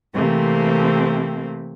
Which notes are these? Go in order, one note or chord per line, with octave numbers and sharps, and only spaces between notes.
C3 E3 A3 A#3 C4